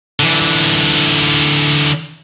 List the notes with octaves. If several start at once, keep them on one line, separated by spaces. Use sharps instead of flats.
D3 E3